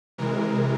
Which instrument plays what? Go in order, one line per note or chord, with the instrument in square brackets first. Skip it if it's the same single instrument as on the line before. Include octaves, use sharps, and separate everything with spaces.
[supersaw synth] C3 E3 G#3 A#4